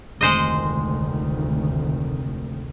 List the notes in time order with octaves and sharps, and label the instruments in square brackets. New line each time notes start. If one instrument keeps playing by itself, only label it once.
[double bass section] F1 D2 D#3 [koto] G#3 C5 D#5